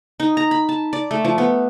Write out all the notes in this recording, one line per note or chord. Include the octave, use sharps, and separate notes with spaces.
D#4
A#5
B5
A5
D5
A3
F3
B3